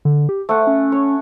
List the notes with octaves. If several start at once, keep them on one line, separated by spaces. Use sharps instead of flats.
D3
G4
A3 C5 F#5
C#4
C#5